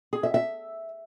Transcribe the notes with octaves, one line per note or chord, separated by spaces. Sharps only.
G#4
E5
E5